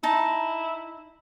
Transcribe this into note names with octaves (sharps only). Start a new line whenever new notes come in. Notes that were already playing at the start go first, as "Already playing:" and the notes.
D#4 E4 A5